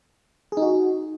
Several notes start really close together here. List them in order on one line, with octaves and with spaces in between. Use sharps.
G#4 D#4 F#4